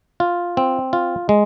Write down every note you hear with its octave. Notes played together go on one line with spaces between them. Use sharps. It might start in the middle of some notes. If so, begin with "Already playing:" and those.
F4
C4
F4
G#3